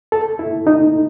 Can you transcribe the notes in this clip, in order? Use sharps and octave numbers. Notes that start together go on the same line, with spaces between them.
A4
E4
D#4